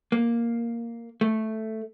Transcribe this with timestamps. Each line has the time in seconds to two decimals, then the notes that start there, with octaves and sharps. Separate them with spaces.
0.12 A#3
1.21 A3